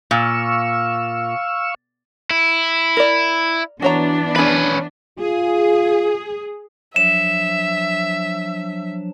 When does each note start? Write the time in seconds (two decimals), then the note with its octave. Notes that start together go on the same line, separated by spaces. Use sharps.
0.11 A#2 F5 C#6 E6
2.31 E4
2.97 A#4 D5
3.82 E3 B3 D4 F#4 C#5 A#5
4.36 C#4 G#4 B4 B5
5.19 F4 G#4
6.96 F3 F#3 D4 E5 E7